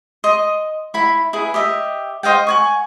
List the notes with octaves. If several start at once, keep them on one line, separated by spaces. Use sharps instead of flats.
D#5 C6
E4 B5
E4 G#4 B4
G4 D#5 E5
C5 D#5 F5 G5
F#5 G#5 C#6